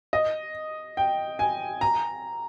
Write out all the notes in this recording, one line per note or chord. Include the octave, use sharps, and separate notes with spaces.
D#5
G5
G#5
A#5